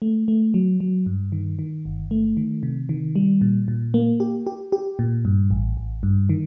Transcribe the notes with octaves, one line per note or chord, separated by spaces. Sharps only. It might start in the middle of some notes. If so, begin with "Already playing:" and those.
A3
A3
F#3
F#3
G2
D#3
D#3
G1
A3
D#3
C3
D#3
G3
A#2
A#2
A#3
G4
G4
G4
A#2
G2
A1
A1
G2
D#3